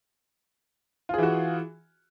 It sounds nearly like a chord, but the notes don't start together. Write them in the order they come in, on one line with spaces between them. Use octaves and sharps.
F4 G#4 E3 F#4